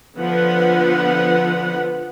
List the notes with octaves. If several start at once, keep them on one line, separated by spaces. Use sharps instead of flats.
D3 F3 B3 B4 F#5